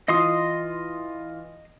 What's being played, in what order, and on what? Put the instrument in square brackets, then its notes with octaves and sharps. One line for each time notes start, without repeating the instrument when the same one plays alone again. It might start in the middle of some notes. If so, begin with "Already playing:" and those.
[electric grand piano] E3 F4 [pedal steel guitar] D#5 C6 D#6